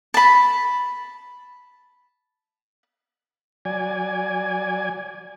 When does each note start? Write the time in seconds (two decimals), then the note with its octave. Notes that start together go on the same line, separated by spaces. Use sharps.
0.14 A5 B5
3.65 F#3 D5 G#5